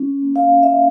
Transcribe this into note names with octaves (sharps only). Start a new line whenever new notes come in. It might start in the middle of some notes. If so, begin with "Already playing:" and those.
Already playing: C#4
A#3
F5
C#4 E5